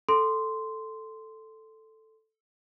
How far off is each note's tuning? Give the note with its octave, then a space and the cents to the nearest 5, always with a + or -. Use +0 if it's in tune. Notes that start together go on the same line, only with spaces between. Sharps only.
A4 +0 C6 -10